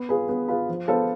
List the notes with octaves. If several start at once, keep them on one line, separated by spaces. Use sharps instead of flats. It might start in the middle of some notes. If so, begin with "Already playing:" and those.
Already playing: B3
F4 G#4 B4
B3
F4 G#4 B4
F3
B3 F4 A4 C5